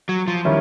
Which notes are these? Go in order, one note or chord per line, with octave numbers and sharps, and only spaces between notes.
F#3
F3
D#3 G3 C#4 E4